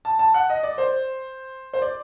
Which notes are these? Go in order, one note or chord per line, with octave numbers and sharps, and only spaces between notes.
A5
A5
F#5
D#5
D5
C5
C5
D5